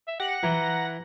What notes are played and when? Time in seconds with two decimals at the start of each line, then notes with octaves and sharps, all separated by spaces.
0.08 E5
0.20 G4 F#5 A#6
0.43 E3 A#5